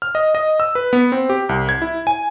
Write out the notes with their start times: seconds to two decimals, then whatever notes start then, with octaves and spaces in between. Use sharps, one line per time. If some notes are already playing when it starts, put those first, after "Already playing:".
0.02 F6
0.15 D#5
0.35 D#5
0.60 E6
0.75 B4
0.93 B3
1.12 C4
1.29 G4
1.49 C2
1.69 G#6
1.82 E4
2.07 G#5